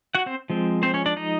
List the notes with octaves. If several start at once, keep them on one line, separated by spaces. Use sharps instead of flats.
F#4 F#5
C4 C5
F3 G#3 C4
C4 C5
C#4 C#5
D4 D5
D#4 D#5